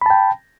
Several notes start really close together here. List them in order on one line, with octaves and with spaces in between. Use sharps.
B5 A5 G5